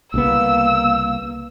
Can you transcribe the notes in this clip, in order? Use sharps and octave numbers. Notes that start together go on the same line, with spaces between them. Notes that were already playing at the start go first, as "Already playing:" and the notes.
C2 C#3 A#3 B3 E6